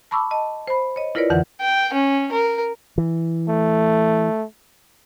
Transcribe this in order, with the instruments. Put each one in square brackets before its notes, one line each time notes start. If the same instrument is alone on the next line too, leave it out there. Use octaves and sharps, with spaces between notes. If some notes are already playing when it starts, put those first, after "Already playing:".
[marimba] A5 B5 C#6 D6 E6
D#5 A5
C5 B5
C#5 D#5
E4 F4 A#4 B4 C#5 D5
F2 D3 E3 F#5
[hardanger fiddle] G5
C#4
A#4
[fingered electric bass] E3
[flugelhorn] A3